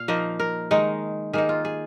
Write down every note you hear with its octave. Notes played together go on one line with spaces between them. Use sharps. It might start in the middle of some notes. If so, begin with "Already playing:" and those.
Already playing: A#2 F5
F3 A#3 D#4 D#5
A#4
D#3 G#3 D#4
D#3 A#3 D#4 G#4
F4
G#4